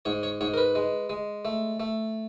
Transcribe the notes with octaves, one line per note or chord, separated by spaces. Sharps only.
G#2 C#5
C#5
G#2 C#5
A#4
B4
G#3
G#3
A3
A3